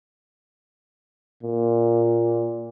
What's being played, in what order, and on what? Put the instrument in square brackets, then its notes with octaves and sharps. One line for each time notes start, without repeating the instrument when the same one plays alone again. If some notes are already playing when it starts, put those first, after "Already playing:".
[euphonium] A#2